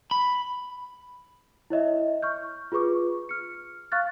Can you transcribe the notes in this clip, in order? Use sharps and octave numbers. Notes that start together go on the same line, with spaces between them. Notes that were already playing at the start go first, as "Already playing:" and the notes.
B5
E4 C#5 D#5 E5
C#6 F6 G6
F4 G#4 B4 C#6 D6
F6 C#7
F5 C#6 F6 F#6 A6